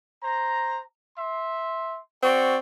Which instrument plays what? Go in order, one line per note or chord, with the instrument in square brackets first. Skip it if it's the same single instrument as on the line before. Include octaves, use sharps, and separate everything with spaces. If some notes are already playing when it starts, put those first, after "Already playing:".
[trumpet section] C5 A#5
E5 C6
[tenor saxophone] C4 [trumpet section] F#4 D5 C#6